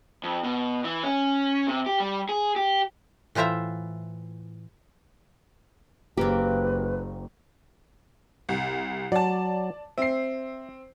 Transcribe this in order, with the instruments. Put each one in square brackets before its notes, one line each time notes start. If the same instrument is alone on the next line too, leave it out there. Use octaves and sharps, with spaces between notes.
[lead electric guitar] F2
B2
E3
C#4
C3
G4
G3
G#4
G4
[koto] A2 E3 F4 C5 E5 A#5
[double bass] F#1 [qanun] A#3 C4 [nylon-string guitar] G4 [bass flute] B4
[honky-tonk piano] C2
[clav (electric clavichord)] F#3 [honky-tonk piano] D5 A5
[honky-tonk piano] C4 C7 [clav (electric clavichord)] E5